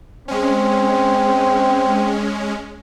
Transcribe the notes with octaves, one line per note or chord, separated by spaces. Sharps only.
G#3 C4 C#4